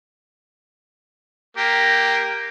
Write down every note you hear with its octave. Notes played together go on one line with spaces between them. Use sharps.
A#3 G4